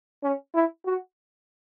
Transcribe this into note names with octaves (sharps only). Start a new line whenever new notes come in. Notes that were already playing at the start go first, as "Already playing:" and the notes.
C#4
E4
F#4